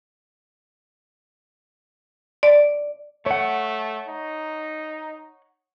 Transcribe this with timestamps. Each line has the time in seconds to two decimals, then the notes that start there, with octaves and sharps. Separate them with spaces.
2.43 D5
3.26 A3 C#5 F#5
4.08 D#4